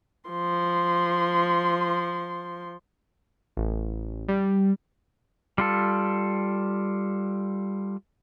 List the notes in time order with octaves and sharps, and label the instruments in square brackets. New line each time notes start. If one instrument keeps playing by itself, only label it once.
[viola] F3 C6
[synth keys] A1
G3
[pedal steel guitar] G3 F4 A4